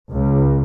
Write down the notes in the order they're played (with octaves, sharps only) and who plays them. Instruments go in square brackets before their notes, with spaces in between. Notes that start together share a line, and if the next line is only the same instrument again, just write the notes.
[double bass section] C#2